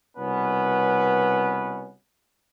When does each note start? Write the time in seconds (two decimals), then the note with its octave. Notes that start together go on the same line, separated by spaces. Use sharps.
0.17 C2 B2 B3 C#4 B4